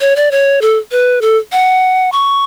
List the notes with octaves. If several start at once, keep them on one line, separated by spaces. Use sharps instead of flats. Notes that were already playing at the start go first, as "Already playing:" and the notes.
C#5
D5
C#5
A4
B4
A4
F#5
C#6